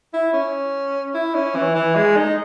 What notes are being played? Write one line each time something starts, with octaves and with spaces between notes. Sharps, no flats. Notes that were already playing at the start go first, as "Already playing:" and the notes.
E4
C#4
E4
C#4
E3
E3
G#3
D#4